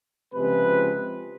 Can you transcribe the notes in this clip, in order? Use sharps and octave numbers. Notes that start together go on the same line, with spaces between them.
C#2 C3 F3 G#3 B4